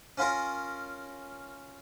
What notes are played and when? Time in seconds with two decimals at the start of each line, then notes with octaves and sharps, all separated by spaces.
0.18 C#4 F4 A#4